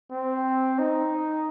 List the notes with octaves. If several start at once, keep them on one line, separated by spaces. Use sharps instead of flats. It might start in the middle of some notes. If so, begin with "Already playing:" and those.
C4
D#4